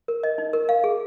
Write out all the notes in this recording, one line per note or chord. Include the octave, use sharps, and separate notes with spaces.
A#4
D#5
D#4
A#4
F5
G#4